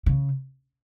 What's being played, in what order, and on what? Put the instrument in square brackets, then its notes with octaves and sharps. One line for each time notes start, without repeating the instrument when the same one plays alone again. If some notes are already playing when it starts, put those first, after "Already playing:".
[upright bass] C#3